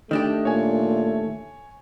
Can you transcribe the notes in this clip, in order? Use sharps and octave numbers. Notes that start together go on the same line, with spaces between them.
D#3 A3 D4 G4 D#5
A#2 C#5 G#5